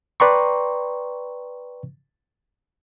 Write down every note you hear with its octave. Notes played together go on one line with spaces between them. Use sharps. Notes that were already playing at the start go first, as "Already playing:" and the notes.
B4 D5 G5 A#5 C6 C#6